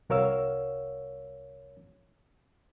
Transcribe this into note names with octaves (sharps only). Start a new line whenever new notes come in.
C2 F#4 A#4 C#5 F5 E6